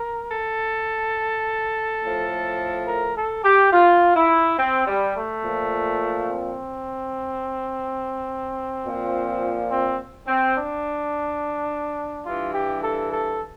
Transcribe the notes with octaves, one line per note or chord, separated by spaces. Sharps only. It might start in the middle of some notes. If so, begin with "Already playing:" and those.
Already playing: A#4
A4
A2 F3
A#4
A4
G4
F4
E4
C4
G3
A3
A#2 F3
C4
A#2 F3
C4
C4
D4
G2 E3 F4
G4
A4
A4